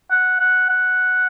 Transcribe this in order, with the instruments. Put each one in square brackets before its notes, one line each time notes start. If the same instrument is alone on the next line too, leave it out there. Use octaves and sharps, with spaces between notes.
[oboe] F#5
F#5
F#5